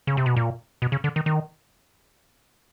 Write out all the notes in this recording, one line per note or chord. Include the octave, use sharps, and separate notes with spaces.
C#3
C3
B2
A#2
B2
C#3
D3
D#3
D#3